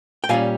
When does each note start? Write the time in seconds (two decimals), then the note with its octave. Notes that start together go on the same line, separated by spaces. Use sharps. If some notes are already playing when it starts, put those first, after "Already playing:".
0.24 G5
0.29 A#2 G3 C#4 F5 G#5